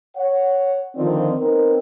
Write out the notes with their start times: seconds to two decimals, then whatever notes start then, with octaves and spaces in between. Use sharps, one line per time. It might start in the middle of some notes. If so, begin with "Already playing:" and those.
0.17 C#5 F#5
0.96 D3 D#3 F3 C4 F4 D5
1.39 B3 C4 D#4 A#4